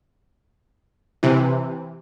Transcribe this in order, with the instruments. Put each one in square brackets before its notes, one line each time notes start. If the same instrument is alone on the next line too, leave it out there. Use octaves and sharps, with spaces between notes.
[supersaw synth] C3 E3